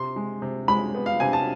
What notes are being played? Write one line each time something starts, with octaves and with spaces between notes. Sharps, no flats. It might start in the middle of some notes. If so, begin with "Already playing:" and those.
Already playing: C3 C6
G#3
C3
G#3 B5
B3
F5
C3 G#5
A5